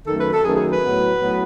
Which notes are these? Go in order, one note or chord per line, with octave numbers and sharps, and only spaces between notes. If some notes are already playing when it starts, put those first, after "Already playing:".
F#2 D#3 A3 A4
B4
A4
F#2 D#3 A3 G#4
G#4
B4
A2 F#3 B3
A2 F#3 B3